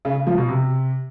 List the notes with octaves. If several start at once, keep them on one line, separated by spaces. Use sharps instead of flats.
C#3
C#3
F3
B2
C3